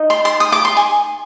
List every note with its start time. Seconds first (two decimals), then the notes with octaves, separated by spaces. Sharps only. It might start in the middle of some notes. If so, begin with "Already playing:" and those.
Already playing: D#4 D#5
0.10 C6
0.25 C6
0.40 D#6
0.52 D6
0.65 C6
0.77 G#5